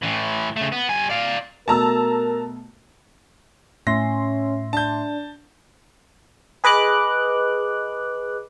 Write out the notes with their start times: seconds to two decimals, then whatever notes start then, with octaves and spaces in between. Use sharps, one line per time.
0.02 A2 E3
0.56 C#3 A3
0.72 B3
0.89 G3 G#5
1.09 D5 F5
1.68 B2 A3 A#4 A5 A#5 E6
3.87 A2 C#4 E5 C6 A#6
4.73 D4 A5 G6
6.64 G#4 B4 D#5 D6 F#6